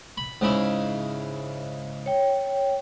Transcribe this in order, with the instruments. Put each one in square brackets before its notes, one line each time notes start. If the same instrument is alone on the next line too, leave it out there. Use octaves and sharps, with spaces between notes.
[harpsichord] B5
G#2 C#3 E4
[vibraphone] C#5 G5